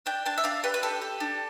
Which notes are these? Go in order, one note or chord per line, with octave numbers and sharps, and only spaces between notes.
D4 G5
D4 A5
E5
D4 F5
G4 B4
B4
G4 A4
G4
D4